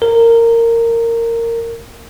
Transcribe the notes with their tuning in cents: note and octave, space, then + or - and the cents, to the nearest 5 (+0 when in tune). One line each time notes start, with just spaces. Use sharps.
A#4 -15